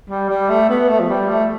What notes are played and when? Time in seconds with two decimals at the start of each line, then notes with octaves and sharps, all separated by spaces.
0.10 G3
0.29 G3
0.49 A3
0.69 B3
0.89 A3
1.00 F3
1.09 G3
1.29 A3